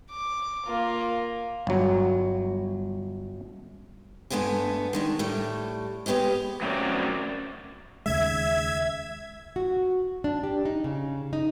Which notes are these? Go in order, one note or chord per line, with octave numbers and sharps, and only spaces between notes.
D6
A#3 F4
G1 F#3
G2 G#3 A3 B3 D4 G#5
D#3 G#3 D4
A2 G3 A3
G#3 B3 G4 C#5 D#5
F#3 A3 C4 C#4 A#4 D5
D#2 C#3 G#3 E5 G#6
F#4
D4
G4
D#4
C#3
D#4